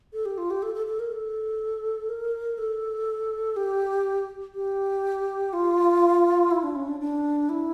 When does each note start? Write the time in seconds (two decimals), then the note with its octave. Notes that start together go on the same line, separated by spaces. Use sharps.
0.13 A4
0.25 G4
0.38 F4
0.51 G4
0.63 A4
0.75 A4
0.86 A4
0.99 A#4
1.12 A4
2.09 A#4
2.58 A4
3.56 G4
4.55 G4
5.53 F4
6.51 E4
6.63 D4
6.76 C#4
6.88 D4
7.00 D4
7.49 E4